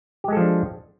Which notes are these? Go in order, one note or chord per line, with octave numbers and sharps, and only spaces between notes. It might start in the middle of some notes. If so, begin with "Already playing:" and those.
F3 G#3 D4 G4 A4